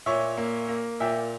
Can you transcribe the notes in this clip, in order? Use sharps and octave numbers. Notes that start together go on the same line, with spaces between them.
A#2 C#5 E5
A#3
A#3
A#2 E5 G5